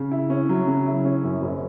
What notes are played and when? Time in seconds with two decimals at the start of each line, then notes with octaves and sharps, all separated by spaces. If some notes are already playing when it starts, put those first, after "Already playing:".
Already playing: C#3
0.11 E4
0.30 C#4
0.49 F#3
0.67 C#3
0.86 E4
1.05 C#4
1.24 F#2
1.42 F#1